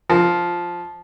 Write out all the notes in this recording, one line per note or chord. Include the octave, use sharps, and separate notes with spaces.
F3